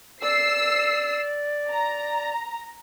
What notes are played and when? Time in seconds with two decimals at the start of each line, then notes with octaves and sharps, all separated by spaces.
0.22 D5 E6 C7
1.71 A#5